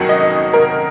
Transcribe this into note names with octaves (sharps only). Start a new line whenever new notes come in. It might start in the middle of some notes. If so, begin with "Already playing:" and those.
Already playing: F2 D#3 F#3 A#3 F#4
D#5
A#4